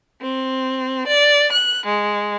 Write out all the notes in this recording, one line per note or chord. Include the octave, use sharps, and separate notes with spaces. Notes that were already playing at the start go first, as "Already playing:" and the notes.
C4
D5
F#6
G#3